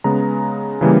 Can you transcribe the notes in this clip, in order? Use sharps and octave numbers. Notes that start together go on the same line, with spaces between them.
C#3 G#3 B3 A#5
C#3 E3 G3 A#3